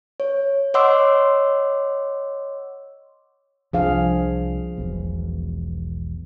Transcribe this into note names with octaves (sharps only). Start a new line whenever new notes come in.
C#5
C#5 D#5 F#5 C6 D6 E6
C2 F3 D4 G#4 F5
E1 B1 B2